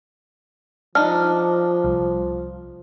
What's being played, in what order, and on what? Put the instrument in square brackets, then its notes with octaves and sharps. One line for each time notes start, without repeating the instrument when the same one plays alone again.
[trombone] F3 [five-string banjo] D4 D#4 [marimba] F6
[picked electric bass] C2